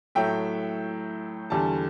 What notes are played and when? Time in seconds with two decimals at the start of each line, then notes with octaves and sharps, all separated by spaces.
0.15 A2 F#3 A3 E5 G5
1.50 E2 D3 G3 A5